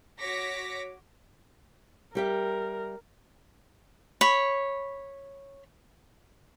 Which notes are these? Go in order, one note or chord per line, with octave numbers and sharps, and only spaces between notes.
F#4 C#5 D6 A#6 B6 C#7
G3 G4 A#4 E5
C#5 B5